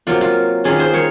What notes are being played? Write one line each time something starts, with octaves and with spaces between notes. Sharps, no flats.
C3 F#3 A#3 F4
F4
D#3 A#3 C#4 F4 G#4
G#4 C5
A#4 C#5